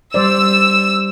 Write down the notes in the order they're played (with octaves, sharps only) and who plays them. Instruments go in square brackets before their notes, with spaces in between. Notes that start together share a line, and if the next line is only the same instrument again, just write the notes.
[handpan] G3 C5 D5 [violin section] E6